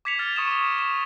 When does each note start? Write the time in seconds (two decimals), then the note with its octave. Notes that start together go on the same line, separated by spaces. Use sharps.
0.05 D6 G#6 B6 C#7 F7
0.19 F6 A6 B6
0.36 C#6 D#6 E7
0.51 C#6
0.79 C#6 E7